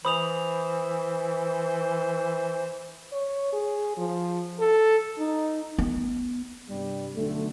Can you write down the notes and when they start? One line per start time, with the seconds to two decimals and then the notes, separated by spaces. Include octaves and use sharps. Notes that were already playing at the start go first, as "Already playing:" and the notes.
0.05 E3 C5 B5 D#6 F7
3.12 C#5
3.52 G#4
3.97 F3
4.60 A4
5.18 D#4
5.78 B3
6.70 G2 C3 G3
7.16 B1 D3 A3